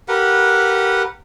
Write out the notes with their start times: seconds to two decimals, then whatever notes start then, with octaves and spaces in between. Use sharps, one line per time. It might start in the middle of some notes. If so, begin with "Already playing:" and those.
0.08 G4 A#4 B4 F#5